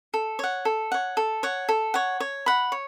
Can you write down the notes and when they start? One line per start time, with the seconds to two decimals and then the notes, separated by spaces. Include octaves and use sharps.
0.14 A4
0.39 C#5 F#5
0.65 A4
0.92 C#5 F#5
1.17 A4
1.43 C#5 F#5
1.69 A4
1.94 C#5 F#5
2.20 C#5
2.46 F#5 B5
2.72 C#5